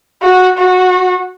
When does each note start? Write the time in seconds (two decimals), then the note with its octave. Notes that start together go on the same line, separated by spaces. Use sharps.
0.23 F#4
0.58 F#4